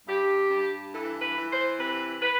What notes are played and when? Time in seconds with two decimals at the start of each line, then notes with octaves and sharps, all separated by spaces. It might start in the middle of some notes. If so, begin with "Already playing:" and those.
0.07 G2 G4
0.50 G2
0.93 E3 A4
1.21 B4
1.36 E3
1.50 C5
1.79 C3 B4
2.21 B4